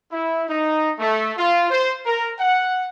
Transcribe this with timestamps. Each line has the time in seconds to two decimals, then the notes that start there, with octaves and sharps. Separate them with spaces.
0.12 E4
0.48 D#4
0.99 A3
1.38 F4
1.70 C5
2.06 A#4
2.40 F#5